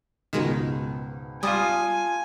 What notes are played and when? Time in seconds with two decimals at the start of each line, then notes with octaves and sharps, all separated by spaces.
0.33 C#2 G#2 B2 D#3 G#3
1.43 G3 F4 G#5 A5 D#6